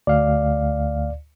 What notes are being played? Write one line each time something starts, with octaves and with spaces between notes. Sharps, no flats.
D2 D5 F5